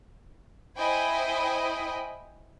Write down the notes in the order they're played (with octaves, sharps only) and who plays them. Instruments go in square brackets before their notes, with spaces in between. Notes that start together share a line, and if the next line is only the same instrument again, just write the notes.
[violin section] E4 C5 D#5 G5 G#5 B5